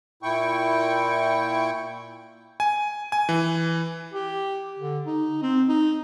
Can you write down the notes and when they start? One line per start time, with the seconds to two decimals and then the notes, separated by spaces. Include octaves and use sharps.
0.23 A#2 E4 G5 C#6
2.60 G#5
3.12 G#5
3.29 E3
4.13 G4
4.79 D3
5.06 D#4
5.42 C4
5.68 D#4